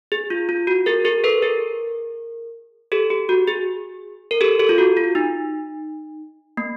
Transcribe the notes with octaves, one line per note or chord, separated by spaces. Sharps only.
G#4
F4
F4
F#4
G#4 A#4
G#4 A#4
A4 B4
G#4 A#4
G4 A4
G4
F#4
G#4
A#4
G4 A4
G4 A4
F4
F#4
F4
D#4
A#3